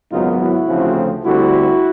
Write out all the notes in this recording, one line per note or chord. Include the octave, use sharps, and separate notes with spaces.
G#1 F#2 C#3 F#3 B3 D#4 F4
E4 F#4
D2 C#3 F3 A3 C4
D2 D3 G3 C4 E4 F#4